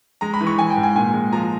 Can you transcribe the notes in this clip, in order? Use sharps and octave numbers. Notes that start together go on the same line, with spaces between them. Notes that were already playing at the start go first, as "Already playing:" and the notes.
G#3 A#5
B5
E3
C#6
E3 G#5
G5
G#2
G#5
A#2 G#5
G#3
F3 A#5